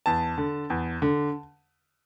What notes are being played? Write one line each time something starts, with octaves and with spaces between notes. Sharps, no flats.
E2 A5
D3
E2
D3